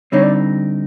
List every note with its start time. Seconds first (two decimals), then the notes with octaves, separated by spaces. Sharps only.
0.12 D3 G3 C4 D#4 C#5
0.23 D5